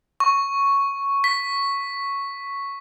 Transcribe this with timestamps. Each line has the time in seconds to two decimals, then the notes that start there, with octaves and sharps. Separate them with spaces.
0.20 C#6
1.24 B6